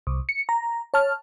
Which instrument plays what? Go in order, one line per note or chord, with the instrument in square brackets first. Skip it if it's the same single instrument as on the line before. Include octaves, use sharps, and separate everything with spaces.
[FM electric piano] C2
C#7
A#5
C#5 A5 F6